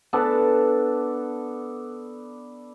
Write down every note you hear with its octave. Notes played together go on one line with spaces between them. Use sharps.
B3 D4 A4